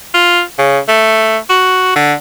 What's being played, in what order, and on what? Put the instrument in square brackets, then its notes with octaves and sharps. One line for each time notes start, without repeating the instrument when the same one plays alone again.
[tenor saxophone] F4
C#3
A3
F#4
D3